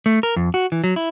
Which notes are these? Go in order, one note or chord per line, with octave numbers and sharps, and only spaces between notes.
A3
A#4
F2
F#4
E3
F#3
E4